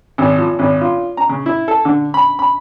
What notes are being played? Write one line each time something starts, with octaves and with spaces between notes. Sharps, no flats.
G#1
F3
G#1
F4
A#5
C#3
E4
A4
D3
B5
B5